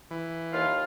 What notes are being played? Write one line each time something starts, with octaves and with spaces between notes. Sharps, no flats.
E3
D#2 F4 F5